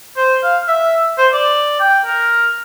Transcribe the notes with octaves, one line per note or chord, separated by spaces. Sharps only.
C5
F5
E5
C5
D5
G5
A#4